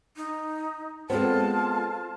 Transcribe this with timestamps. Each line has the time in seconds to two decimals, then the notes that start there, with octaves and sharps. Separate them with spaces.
0.16 D#4
1.10 G#3 B3 C4 F4 A4 A5